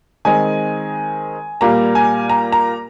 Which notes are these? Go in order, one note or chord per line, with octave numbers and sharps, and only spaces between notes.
D#3 G#3 C4 G#5
A#2 G3 A#3 A#5
G#5
A#5
A#5